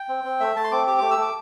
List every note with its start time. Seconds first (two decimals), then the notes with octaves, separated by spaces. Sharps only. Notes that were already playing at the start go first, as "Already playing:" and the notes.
Already playing: G5
0.09 C4
0.24 C4
0.40 A3 E5
0.56 A3 A5
0.64 C6
0.72 C4 D6
0.87 G4 D6
0.98 A3 D6
1.11 E6
1.18 A3 D6